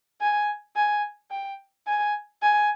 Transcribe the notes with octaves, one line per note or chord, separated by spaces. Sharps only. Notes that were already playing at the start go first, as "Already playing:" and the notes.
G#5
G#5
G5
G#5
G#5